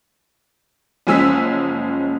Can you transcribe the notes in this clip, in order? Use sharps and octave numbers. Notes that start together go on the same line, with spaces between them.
F#1 F3 G#3 C#4 E6 B6